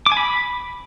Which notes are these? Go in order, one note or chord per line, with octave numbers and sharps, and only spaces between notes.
D6
G#5
B5